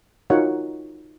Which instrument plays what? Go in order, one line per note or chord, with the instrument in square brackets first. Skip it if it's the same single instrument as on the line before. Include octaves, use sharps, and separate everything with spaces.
[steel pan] D#4 F4 F#4 A#4 C#5 F#5